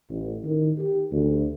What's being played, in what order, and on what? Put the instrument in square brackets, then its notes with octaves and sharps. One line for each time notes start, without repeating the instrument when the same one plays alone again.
[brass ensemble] A1
D#3
G4
D2